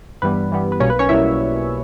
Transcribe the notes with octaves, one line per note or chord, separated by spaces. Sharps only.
G2 E3 G3 B3 B4
G2 E3 G3 B3
B4
B1 B2 G3 A#3 C#4 C#5
B4
C#4 C#5
B2 G3 A#3 E4 E5